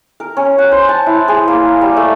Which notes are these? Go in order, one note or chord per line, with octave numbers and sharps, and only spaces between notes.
A#4
C#4
F#5
C5
A5
E4
G#4
A#3
G3
A3